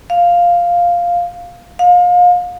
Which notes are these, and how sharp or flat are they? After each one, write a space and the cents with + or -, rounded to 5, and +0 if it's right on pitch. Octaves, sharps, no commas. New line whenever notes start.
F5 +0
F5 +30